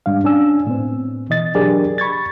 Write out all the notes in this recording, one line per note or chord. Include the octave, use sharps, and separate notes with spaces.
G#2 G3 D4 F5
C#4 D4 G#5 E6
A2 B3 C4
B2 E3 D#5 A6
F#3 D4 G4 G#4 A#4 D5
B5 C#6 G#6 A6